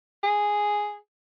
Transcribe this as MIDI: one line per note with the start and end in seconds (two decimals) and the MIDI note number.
0.23 0.97 68